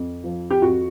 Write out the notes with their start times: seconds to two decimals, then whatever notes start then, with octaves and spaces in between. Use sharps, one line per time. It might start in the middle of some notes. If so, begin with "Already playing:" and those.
Already playing: F2
0.24 F3
0.51 G4
0.62 F2 F#4